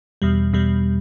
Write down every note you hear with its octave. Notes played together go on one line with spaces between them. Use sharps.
E2 B2 G3
E2 B2 G3